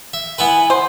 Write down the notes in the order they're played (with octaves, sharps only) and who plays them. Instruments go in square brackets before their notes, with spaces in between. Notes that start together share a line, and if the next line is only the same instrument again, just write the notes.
[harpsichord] E5
[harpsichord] B3 E4 B4 [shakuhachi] G#5
[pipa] C5